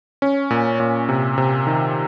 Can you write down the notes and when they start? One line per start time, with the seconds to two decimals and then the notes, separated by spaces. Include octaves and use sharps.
0.22 C#4
0.50 A#2
0.80 A#2
1.09 C3
1.38 C3
1.67 D#3